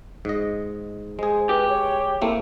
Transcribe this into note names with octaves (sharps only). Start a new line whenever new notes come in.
G#2 D#5
G#3 G#4 C5
G4 B4
C#5
A3 A#3 C4 E4